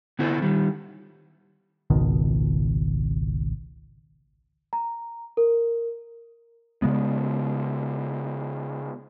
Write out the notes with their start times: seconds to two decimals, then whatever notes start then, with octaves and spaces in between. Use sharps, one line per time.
0.19 D3 B3 E4 A4 C5
0.42 D#3 G3
1.90 G#1 C#2 B2 D#3
4.73 A#5
5.37 A#4
6.82 C#3 G#3 B3